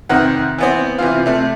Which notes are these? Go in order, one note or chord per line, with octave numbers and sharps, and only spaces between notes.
F2 C3 D#3 F#5
E3 B3 C4
C3 E3 F4
C3 A3